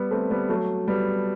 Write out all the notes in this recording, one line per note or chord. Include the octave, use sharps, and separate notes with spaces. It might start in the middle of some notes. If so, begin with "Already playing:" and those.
Already playing: G3 B3
A3 C4
G3 B3
F#3 A3
G3 B3